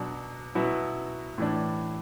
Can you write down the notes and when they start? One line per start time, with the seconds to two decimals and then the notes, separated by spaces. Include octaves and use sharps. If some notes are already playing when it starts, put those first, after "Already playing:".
Already playing: B2 F#3 D4
0.55 B2 F#3 B3 E4
1.38 A2 E3 D4